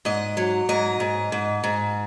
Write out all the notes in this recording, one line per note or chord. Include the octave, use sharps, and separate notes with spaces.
G#2 D#5
F#3
G#2 D#5
G#2
G#2
G#2